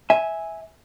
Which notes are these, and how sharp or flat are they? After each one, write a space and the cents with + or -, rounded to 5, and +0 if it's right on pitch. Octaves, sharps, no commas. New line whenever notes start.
E5 -15 G#5 +0